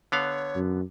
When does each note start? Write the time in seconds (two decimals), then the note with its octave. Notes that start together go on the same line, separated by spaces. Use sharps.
0.12 D3 B3 C#5 F5
0.55 F#2